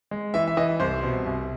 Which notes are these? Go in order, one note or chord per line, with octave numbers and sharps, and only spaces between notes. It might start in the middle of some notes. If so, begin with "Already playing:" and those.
G#3
E3 E5
E5
E3 D#5
C2 C5
B2
C2